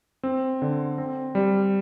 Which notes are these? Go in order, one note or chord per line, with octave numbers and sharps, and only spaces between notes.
C4
D3
C4
G3